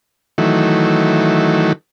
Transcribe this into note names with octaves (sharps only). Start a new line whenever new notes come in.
D#3 E3 F#3 A3